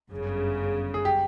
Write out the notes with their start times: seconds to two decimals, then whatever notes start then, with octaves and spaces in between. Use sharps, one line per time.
0.10 G1 F#2 C#3
0.94 G#4
1.05 G4